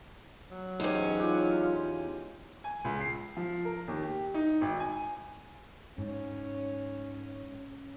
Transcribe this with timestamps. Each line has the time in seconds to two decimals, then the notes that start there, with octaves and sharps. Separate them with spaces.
0.51 F#3
0.80 E2 G#2 C#4 G4
1.20 F4 G4
2.64 G#5
2.85 C#2
3.01 C7
3.37 F3
3.65 A#4
3.88 D#2
4.03 G4
4.34 D#4
4.61 G#1
4.80 G#5
5.98 G#2 C#4